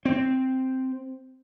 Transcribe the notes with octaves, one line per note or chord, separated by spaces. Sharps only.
C4